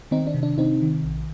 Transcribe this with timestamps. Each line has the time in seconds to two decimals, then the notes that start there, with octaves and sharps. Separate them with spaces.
0.11 D#3 C4 D#4
0.27 D4
0.34 C3
0.43 D4
0.58 C3 C4 D#4
0.81 D#3
1.04 A#1